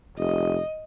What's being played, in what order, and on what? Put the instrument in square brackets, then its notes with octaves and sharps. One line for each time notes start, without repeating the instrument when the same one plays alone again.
[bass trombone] F1 [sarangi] D#5